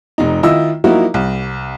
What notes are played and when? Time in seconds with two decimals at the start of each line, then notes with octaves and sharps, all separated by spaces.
0.18 F1 D#4
0.43 D#3 E4 F4 D#5 E6
0.84 F3 F#3 A#3 D#4 E4 F#4
1.14 C2